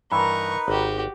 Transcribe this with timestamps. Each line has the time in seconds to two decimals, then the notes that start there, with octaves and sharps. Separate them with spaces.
0.12 G2 E3 D#4 A#4 B4 B5 C#6
0.68 G#1 F#4 G4